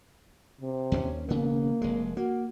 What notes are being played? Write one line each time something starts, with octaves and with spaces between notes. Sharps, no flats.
C3
D#2 A3 C#4
E1 C#3 A#3 B3
F1 G#3
A#3 F#4